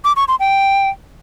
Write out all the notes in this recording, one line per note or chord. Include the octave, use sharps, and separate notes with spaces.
D6
C#6
C6
G5